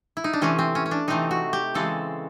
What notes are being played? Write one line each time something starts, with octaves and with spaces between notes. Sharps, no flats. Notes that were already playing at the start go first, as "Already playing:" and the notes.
E4
D#4
D4
C3 E3 A3 C4 C#4
C4
C#4
C#4
D4
C3 E3 A3 C4 D#4
F#4
G4
C#3 E3 G#3 C4 A4